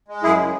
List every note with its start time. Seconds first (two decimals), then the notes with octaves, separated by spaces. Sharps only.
0.08 G#3
0.23 F#2 E4 G#4
0.38 C#3